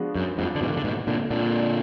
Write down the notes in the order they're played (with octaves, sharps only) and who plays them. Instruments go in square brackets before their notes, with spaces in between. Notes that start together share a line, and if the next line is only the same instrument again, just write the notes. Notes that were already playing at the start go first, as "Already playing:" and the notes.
Already playing: [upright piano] F3 G#3 B3 D4 F#4
[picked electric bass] F#2
F2 G#2
D3
G#2 B2
D#3
D3
G#2 B2
A#2 D3
A#2 D3